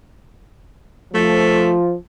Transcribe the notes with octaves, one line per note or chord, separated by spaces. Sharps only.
F3 A3